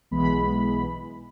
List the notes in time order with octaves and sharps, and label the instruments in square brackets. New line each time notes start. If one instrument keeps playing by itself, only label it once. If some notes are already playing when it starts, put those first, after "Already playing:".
[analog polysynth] B1 E3 G#3 B3 B5